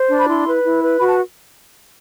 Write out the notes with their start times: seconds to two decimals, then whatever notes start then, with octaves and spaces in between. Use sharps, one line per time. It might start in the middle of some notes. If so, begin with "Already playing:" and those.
Already playing: C5
0.09 D4
0.19 B5
0.27 E4 C6
0.46 B4
0.64 E4
0.82 B4
1.00 F#4 B5
1.10 A5